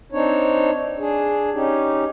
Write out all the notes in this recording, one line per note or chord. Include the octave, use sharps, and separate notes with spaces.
C4 D4 D#4 C#5
D4 G#4
C#4 D#4 G4